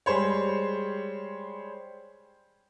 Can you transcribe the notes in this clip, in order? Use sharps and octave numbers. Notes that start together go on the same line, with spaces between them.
G3 G#3 G#4 C5 C#5